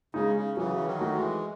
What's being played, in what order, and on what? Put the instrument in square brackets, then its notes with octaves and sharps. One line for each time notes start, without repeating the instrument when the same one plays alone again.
[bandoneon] C#3 [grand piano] G#3 D#4
[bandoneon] C#3
[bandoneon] C#3 E3 [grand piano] F#3
[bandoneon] E3
D#3 F#3
[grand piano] A3 D#4 F#4
[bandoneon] E3 G#3